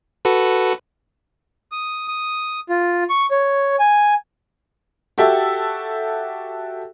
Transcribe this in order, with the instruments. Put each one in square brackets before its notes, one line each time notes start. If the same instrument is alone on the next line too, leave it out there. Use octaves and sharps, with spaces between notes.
[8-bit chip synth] F#4 A4 B4
[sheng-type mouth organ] D#6
D#6
F4
C#6
C#5
G#5
[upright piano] F#4 G4 A4 E5